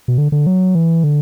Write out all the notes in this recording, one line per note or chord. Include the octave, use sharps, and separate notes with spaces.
B2
D3
D3
F#3
E3
D3